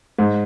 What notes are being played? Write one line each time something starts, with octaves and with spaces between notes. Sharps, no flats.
G#2